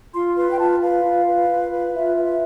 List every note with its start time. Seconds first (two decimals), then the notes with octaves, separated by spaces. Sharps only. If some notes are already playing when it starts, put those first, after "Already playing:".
0.13 F4 C6
0.36 B4 C6
0.51 G5
0.59 F4 A5
0.82 B4 F5
1.04 F4
1.27 B4
1.50 F4
1.72 B4
1.94 F4 E5
2.17 B4
2.24 E5